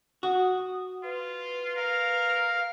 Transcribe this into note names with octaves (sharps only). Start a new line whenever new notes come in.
F#4 D#6
F4 B4
A#4 F5